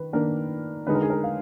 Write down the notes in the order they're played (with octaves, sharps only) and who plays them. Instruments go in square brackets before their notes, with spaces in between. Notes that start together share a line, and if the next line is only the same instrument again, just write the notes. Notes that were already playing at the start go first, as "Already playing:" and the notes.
Already playing: [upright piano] D#3 B4
D#3 A#3 D4 A#4
D3 G#3 D#4 B4
A#4
G#4
A#4
F5